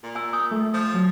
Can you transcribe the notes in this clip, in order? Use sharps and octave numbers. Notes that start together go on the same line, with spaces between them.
A#2
G#5 E6
D#6 G6
A3
F3
F#3